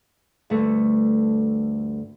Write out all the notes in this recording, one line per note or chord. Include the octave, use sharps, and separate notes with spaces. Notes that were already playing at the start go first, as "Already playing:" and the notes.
D2 G2 A3